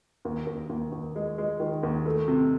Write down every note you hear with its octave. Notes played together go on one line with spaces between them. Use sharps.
D#2
D#2
D#2
D#2
G#3
G#3
D#3
D#2
A3
C3